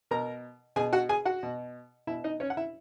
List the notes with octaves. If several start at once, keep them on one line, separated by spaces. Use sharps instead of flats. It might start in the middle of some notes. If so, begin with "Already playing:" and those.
B2 A#4 A#5
B2 G#4 G#5
F#4 F#5
G#4 G#5
F#4 F#5
B2
B2 E4 E5
D#4 D#5
C#4 C#5
F#5
E4 E5